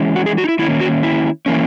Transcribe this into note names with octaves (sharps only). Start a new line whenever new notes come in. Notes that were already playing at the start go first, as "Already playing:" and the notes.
Already playing: E3 G#3 C#4
F#4
G#4
F#4
D#4
E4
D#3 A#3 C#4 E4
F#4
E4
E3 A#3 C#4